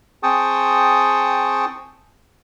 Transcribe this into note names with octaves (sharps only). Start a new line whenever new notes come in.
C4 G#4 G5 A5 C#6 D#6